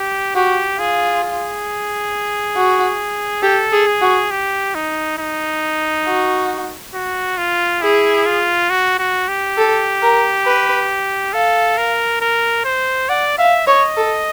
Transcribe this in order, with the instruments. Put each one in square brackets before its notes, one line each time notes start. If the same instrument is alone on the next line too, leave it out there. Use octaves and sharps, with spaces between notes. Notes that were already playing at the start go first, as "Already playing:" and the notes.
Already playing: [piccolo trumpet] G4
[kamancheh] F#4 [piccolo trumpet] G4
[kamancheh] F4 [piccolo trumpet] G#4
[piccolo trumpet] G#4
[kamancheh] F#4
[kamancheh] G4 [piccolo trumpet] A4
[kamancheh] G#4
[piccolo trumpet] G#4
[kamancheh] F#4
[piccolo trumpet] G4
D#4
D#4
[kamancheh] F#4
[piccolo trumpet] F#4
F4
[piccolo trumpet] E4 [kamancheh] G#4
[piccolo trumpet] F4
F#4
F#4
G4
[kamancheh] A4
A#4
B4
[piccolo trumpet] A4 [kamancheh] F5
[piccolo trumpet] A#4
A#4
C5
[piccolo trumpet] D5 [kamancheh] F#5
[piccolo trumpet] E5 [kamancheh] F5
[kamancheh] C#5 [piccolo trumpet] D#5
[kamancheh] A4